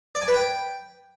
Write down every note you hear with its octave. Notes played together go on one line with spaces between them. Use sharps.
D5
G#5
B4
G5